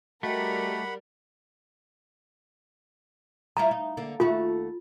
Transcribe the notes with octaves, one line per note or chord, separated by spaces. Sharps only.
G3 A3 F#4 A#4 D#5 F#5 G5 B5
G3 E4 F4 A#5
D#4
D3 A#3
D#2 A3 F4 F#4